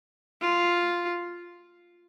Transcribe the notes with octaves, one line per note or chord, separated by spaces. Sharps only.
F4